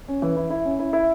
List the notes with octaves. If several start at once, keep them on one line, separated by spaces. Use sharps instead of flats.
C#4
E3
E4
E4
C#4
E4
E4